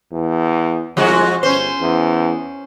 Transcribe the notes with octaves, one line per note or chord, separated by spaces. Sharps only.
E2
C2 F3 G#3 F#4
G1 C#4 C5
E2